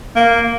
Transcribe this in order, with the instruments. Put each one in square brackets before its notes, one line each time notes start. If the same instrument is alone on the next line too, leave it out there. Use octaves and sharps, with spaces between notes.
[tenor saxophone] A#3